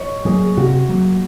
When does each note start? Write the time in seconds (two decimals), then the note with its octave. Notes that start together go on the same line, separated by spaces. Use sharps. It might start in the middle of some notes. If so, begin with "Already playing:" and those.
Already playing: C#5 D#5
0.25 F#3 A#3 G#4
0.57 C3 F#4
0.89 F#3 A#3